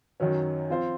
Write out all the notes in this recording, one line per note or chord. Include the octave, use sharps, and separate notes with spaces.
F#2 D#3 F#3 C#4
F3 C4 F4 C5